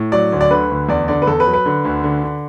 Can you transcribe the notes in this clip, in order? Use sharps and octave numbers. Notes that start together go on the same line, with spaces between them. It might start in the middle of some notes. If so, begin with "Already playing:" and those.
Already playing: A2
F#3 D5
D2
D5
D3 B4
D2
E2 D5
D3 D5
B4
E2 A4
B4
F#3
B4
D3
D2
D3
D3